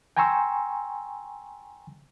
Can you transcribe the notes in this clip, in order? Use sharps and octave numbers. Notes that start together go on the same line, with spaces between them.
G5 G#5 A#5 C6 C#6 E6